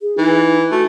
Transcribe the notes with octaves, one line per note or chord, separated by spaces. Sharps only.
G#4
E3 D#4
A3 F#4